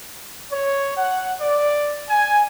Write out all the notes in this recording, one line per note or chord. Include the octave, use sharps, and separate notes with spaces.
C#5
F#5
D5
G#5